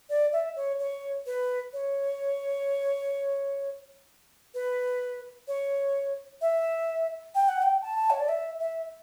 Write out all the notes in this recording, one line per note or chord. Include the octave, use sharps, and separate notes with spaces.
D5
E5
C#5
C#5
B4
C#5
B4
C#5
E5
G5
F#5
G5
A5
C#5
D5
E5
E5